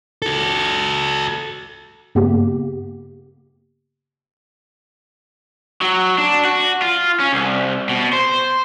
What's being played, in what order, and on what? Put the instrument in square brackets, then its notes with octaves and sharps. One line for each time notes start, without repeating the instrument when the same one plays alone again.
[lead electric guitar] F#4 A4
[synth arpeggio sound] G2 C#3 A#3 B3 G4
[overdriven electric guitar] F#3
D4
F#4
F4
C#4
C2
B2
C5